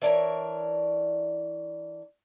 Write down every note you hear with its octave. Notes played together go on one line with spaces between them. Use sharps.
E3 D4 A#4 C#5